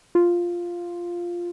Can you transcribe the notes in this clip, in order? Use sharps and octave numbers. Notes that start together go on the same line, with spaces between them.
F4